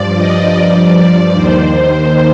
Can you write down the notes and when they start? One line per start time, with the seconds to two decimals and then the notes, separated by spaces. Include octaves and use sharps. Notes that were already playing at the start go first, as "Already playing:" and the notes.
Already playing: G2 F3 D5
0.17 D#5
0.56 G2 F3 D5
1.35 D#2 D#3 C5